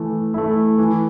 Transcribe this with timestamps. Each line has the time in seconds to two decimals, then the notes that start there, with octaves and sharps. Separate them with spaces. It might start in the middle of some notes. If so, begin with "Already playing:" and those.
Already playing: E3 A3
0.34 A3 E4
0.78 E3